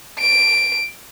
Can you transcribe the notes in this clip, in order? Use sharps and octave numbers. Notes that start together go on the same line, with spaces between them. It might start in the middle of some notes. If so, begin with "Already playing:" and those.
D7